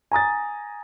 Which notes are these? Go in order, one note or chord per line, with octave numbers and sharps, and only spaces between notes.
G#5 A#5 D#6 A6